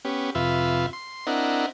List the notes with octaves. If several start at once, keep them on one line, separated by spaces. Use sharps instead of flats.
B3 C#4 G4
F2 C3 F4 B4 E5
C6
C4 D4 E4 A#4 D#5 F#5